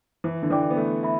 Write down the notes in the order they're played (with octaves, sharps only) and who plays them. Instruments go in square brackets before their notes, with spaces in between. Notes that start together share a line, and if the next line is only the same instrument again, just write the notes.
[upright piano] E3 [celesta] E4
[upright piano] D3
[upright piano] E3 [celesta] B4 D5 G5 D6
[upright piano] B3
[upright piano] A3 [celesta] A4
[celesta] E5 B5